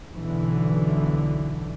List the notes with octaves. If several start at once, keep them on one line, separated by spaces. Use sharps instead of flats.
B1 B2 D3 E3